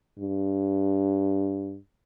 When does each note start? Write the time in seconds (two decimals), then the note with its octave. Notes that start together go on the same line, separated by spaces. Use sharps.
0.19 G2